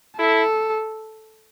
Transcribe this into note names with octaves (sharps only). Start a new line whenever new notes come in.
E4 A4